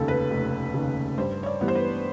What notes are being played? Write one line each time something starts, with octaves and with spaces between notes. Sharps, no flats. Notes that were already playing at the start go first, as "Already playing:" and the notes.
Already playing: F1 D#2 C#3 A4
B4
F1
D#2 C#3
G2 C5
C#5
D5
E3 G3 B3
C5
B4